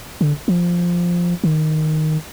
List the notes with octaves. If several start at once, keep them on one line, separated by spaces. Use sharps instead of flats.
D3
F3
D#3